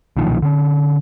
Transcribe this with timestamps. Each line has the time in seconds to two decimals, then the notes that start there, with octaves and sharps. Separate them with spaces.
0.17 B1 A#2 D#3 F3
0.42 D3 C#4